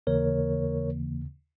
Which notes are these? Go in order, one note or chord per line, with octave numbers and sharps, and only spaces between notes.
D#2 C#3 E3 A#3 A#4 C#5